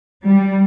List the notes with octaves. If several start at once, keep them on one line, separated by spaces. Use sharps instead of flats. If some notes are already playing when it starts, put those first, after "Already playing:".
G3